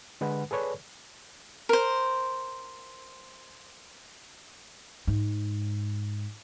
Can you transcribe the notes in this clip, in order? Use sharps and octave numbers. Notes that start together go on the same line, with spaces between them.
D3 G#3 B4 F#5
G#4 A4 B4 C#5 D5
A#4 C5
G#2